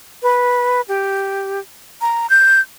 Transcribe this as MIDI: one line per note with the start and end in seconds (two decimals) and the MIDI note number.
0.23 0.81 71
0.88 1.59 67
2.01 2.29 82
2.30 2.60 91